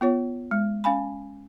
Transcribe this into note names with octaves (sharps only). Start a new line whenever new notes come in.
B3 F4 C#5
G#3
C#4 F5 G#5 B5